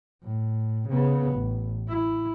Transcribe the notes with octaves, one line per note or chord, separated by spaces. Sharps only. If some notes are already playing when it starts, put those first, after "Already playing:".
A2
C#3 B3
A1
E4